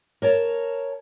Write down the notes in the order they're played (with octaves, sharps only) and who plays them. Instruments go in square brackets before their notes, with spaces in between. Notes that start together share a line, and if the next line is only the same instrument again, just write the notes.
[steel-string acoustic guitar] A#4 C#5 A5